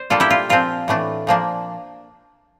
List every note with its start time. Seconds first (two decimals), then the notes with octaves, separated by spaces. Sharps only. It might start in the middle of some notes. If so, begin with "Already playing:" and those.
Already playing: C5 D5
0.10 A#2 G3 A#3 D4 F4 A4
0.20 E4 G4
0.30 F4
0.49 A#2 F3 C4 F4
0.88 A2 E3 A3 D4
1.27 A#2 F3 A#3 D4